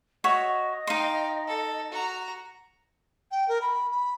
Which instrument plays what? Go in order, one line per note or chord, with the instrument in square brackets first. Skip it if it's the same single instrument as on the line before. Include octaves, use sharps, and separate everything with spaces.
[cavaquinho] F#4 C#5 E5 [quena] D#5
[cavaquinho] D#4 C6 [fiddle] F5 G5
[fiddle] A4
F#4 A#5
[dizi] G5
A#4
B5
B5